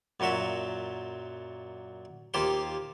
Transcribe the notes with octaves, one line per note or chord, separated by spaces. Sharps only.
F#2 A#2 F#3 F#4 E5
D#2 A#3 F4 G4 C5 C6